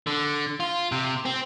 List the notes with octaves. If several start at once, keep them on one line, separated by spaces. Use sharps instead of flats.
D3
F4
C3
C4